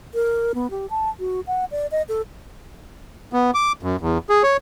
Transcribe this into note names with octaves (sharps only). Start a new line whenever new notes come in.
A#4
B3
G4
A5
F#4
F#5
D5
D#5
A4
B3
D6
F#2
E2
G#4
C#5